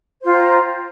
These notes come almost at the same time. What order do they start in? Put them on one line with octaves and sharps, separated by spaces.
C5 F4 G5 A#5